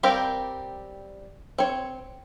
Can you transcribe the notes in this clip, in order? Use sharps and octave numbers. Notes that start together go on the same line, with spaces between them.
G3 C4 G4 A#4 F5
C4 C#5